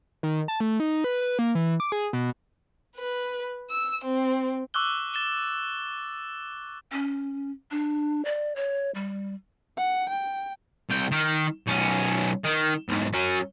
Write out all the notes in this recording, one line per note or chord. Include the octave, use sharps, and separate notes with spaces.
D#3
A5
A3
D#4
B4
B4
A#3
E3
D6
G#4
B2
B4
E6
C4
C#6 D6 E6 F#6 G7
A6 E7 G7
C#4
D4
D5
C#5
G3
F#5
G5
C2 G5
D#3
B1 C#4
D#3
B1 G#2
F#3 C#4